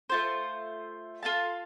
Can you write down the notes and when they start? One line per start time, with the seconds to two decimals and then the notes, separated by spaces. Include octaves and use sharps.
0.10 A3 F4 C5
1.23 F4 A4 F5 A5